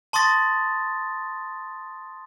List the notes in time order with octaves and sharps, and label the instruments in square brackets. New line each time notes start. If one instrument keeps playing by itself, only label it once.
[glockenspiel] A5 C6 C#6 D#6 A6 A#6